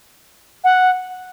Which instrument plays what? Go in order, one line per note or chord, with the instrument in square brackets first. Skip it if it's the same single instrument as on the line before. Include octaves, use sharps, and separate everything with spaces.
[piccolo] F#5